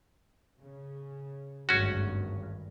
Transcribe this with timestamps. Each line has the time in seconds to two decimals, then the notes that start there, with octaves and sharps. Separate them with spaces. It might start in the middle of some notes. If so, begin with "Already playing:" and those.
0.60 C#3
1.69 G#1 D2 G2 C#4 F#4